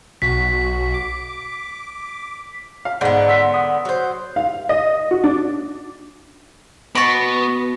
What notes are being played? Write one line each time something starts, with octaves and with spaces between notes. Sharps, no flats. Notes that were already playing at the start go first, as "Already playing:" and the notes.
B1 F#4 B6
D6
F5
G#2 D3 B3
C6 E6 B6
D#6
F#3 C5
F5
D#5
F#4
D4
B2 B3 B5 C#6 A6 A#6 D7